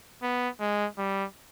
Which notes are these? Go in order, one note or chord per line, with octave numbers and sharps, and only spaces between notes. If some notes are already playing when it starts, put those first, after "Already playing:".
B3
G#3
G3